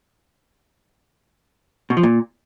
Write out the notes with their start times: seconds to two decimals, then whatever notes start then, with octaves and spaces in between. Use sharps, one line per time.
1.90 B2
1.97 F3
2.03 A#2